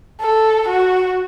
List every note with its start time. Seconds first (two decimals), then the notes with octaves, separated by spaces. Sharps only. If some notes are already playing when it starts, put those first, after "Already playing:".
0.21 A4
0.68 F#4